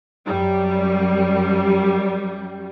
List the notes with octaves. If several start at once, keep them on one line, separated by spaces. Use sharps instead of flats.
F#2 G3